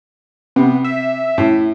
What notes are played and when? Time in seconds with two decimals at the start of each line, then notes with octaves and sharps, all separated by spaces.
0.56 C3 B3
0.84 E5
1.38 A2